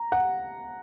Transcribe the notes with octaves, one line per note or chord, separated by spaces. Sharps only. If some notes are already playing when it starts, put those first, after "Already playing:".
Already playing: A#5
F#5